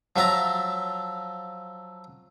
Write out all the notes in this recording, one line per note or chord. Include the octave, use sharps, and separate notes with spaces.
F3 F#3 E5 A5 A#5